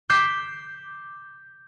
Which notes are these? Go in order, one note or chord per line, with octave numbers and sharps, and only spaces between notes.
D6 G6 B6 C7 E7